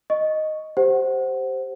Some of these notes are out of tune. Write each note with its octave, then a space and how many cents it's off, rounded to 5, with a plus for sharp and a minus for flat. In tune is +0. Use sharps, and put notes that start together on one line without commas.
D#5 +0 C#6 +0
G4 +0 C5 +0 F#5 +10